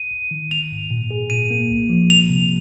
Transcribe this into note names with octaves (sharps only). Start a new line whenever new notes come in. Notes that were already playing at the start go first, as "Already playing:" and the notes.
Already playing: D#7
G#1
D#3
G#1 F7
G#2
A#2
G#4
A#2 D#7
A#3
C2
F3
C2 F7
C3